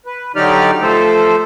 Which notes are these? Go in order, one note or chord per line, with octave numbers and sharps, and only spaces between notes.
B4
D3 F#3 D#4 G4 D5 F6
F3 A3 A4 C5